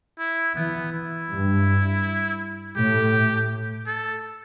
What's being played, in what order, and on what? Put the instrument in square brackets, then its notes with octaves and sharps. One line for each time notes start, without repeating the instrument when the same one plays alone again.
[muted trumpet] E4
[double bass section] E3 [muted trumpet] B3
[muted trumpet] E4
[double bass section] G2
[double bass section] A2 [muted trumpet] G4
[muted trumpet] A4